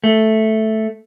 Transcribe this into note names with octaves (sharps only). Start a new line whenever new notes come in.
A3